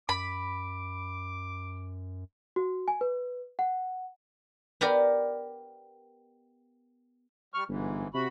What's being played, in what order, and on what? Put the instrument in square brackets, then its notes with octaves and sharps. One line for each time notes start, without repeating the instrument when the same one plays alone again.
[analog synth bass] F#2 [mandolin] B5 [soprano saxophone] D6
[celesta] F#4
G#5
B4
F#5
[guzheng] B3 G4 A#4 D5
[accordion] G3 C#6 F6
[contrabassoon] G1 [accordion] G#2 E3
[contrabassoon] C3 [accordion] F#4 B5